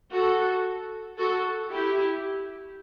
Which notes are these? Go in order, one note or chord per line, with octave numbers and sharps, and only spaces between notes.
F#4 A4
F#4 A4
E4 G4